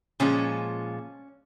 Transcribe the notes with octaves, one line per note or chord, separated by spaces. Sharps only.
A#2 F3 G#3 C#4